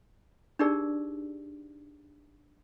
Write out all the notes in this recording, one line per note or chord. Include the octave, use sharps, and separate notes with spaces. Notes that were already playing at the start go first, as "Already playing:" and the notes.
D4 D#4 G4 G#4 A#4 D5